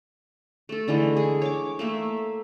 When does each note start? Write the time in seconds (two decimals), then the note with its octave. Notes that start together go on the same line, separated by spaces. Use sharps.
0.69 A3 A4
0.88 D3 E3 G#3 A3
1.17 G#4
1.42 C#5 D6
1.79 A3 A#3 E5